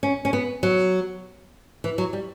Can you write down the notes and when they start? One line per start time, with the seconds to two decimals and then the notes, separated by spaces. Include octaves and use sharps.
0.03 C#4
0.25 C#4
0.33 B3
0.63 F#3
1.84 E3
1.98 F#3
2.13 G3